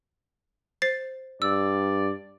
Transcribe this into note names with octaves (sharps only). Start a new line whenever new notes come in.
C5 A6 C7
G2 D5 E6